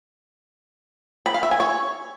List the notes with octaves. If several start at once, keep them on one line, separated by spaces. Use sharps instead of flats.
B5
F5
E5
G#5
C#5